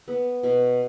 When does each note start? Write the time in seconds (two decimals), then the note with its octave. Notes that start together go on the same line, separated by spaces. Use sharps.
0.08 B3
0.43 B2